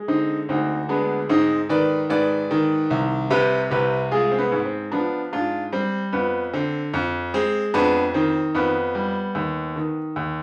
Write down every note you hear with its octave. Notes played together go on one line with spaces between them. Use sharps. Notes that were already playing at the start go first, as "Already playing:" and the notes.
Already playing: G#3
D3 C4 D#4
D2 C4 D#4
G#3 B3 D4
G#2 C4 D#4
D#3 B4 D5
G#2 B4 D5
D#3
C2
C3 G4 B4
C2 G4 B4
G#3 F4 G#4
C4
B3
G#2
C4
F3 B3 D4
G#2 D4 F4
G3 C4
F2 B3
D3 C4
F2
G#3 C4
F2 B3 D4
D#3 C4
F2 B3
G3
D#2
D#3
D#2